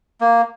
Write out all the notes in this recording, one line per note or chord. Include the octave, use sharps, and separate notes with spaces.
A#3